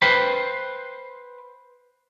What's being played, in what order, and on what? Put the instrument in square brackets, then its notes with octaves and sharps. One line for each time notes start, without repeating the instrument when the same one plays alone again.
[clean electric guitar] B4 C5 F5 G5 B5